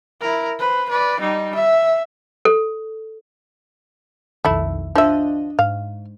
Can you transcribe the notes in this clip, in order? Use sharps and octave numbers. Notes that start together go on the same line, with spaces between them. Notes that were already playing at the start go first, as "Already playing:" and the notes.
E4 A#4
B4 C5
B4 D5
G3 D#4
E5
A4
B1 F2 D#3 A3 E4
F3 D4 D#5 E5
G#2 F5